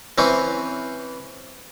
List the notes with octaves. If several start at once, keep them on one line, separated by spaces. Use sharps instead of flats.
E3 C4 C#4